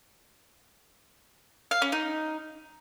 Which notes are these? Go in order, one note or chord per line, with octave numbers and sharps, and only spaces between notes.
F5
C#4
D#4